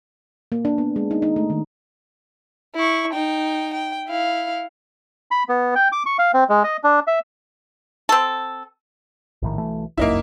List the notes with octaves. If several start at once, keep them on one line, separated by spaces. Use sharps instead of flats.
A#3
D4
B3
G#3
D#4
D#4
A3
D#3
E4 C#6
D#4 G5
G5
E4 F5
B5
B3
G5
D6
C#6
F5
C4
G#3
D#5
D4
E5
C4 A4
A#1 A2 D#3
B1 E3 A3
G1 C#2 F#2 A#3 D#4 E4